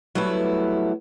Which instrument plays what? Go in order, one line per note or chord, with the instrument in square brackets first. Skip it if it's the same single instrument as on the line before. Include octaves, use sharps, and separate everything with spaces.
[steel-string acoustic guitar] F#3 G3 A3 B3 E4